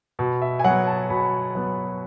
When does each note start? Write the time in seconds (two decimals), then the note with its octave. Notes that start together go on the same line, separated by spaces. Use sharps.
0.19 B2
0.42 E5
0.59 G#5
0.64 F#3 F#5
0.68 B3
0.87 A5
1.10 B2 B5
1.55 F#3 B3